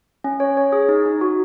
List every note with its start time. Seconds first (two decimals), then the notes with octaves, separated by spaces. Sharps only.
0.24 C#4
0.40 C#5
0.57 C#5
0.72 G#4
0.89 D#4
1.06 D#4
1.21 F#4